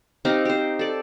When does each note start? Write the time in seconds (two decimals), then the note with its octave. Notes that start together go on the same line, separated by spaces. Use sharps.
0.25 C4 D#4 G4 F5
0.45 G4 C5
0.79 A4 D5